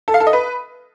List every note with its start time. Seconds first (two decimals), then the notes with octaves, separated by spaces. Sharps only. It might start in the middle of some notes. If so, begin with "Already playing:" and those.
0.08 A4
0.14 F5
0.20 A4
0.27 D#5
0.33 B4